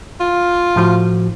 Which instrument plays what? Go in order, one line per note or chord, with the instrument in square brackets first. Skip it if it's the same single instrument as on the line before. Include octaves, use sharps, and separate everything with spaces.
[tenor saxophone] F4
[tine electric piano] A2 F3 F#4